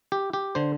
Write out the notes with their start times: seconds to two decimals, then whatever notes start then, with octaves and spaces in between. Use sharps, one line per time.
0.12 G4
0.33 G4
0.55 D3 C5